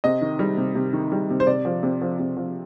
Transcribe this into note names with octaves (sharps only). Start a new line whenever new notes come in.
C3 D#5
D#3
G3
C3
C3
D#3
G3
C3
C5
C3 D5
F3
C3
F3
C3
F3